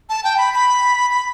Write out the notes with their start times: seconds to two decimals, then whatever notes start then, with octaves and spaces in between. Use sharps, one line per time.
0.09 A5
0.24 G5
0.38 B5
0.54 B5
1.11 B5